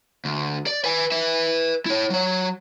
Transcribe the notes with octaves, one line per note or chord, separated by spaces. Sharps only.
D2
D5
B4 G#5
B4 E5
E4 C#5
F#3 C#5